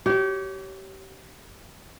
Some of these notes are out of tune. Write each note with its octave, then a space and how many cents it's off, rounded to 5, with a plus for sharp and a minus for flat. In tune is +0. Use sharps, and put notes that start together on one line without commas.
G4 -30 C#5 +0